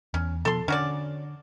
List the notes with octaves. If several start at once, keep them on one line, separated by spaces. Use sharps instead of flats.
E2 C#4
B2 F3 A4 C6
D3 C#4 F#4 D5